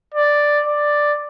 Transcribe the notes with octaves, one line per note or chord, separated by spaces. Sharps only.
D5
D5